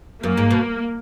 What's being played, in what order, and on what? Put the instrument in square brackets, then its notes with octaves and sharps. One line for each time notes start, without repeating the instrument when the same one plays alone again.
[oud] F#2 [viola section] A#3
[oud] G#2
B2